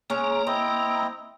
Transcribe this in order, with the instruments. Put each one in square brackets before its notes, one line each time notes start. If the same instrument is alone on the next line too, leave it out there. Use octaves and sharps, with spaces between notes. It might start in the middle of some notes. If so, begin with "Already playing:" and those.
[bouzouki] G#3 C#4 C#5 [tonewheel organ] A#3 A#5
[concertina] C4 E4 D#5 [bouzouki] C5